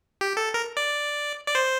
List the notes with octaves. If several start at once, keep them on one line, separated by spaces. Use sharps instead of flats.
G4
A4
A#4
D5
D5
C5